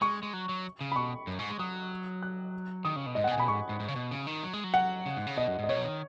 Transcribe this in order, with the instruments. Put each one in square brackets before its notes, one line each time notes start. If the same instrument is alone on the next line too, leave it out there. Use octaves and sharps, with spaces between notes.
[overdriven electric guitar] G#3 [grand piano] C#6
[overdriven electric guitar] G#3
F#3
F#3
C#3
[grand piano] B5
[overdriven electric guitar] B2 [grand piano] C#6
[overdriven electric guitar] F#2
G#2
G#3
[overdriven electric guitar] F#3 [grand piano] D#6
[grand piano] F#6
[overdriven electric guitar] D#3 [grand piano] D#6
[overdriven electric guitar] C#3
B2
[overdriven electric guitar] G#2 [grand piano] D#5
[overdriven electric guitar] B2 [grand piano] F#5
[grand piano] G#5
[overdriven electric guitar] B2 [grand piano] B5
[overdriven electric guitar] G#2 [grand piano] C#6
[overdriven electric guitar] G#2
G#2
C#3
B2
C#3
D#3
F#3
G#3
F#3
[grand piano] F#5
[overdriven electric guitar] C#3
G#2
C#3
[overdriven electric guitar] B2 [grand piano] D#5
[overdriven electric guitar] F#2
[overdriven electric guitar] G#2 [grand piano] D#5
[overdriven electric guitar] B2 [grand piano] C#5
[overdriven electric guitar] F#3
D#3